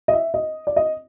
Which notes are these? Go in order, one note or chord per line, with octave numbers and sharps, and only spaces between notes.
D#5
E5
D#5
D5
D#5